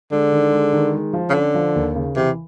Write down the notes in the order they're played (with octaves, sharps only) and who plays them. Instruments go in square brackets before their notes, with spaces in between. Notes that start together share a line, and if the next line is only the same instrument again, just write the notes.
[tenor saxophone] D3 [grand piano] G#3
[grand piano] D#3
G#3
D#3
G#3
F3
[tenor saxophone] C#3
[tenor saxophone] D3 [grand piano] C#4
[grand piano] F3
D#2
C#3
[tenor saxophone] C3 [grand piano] E3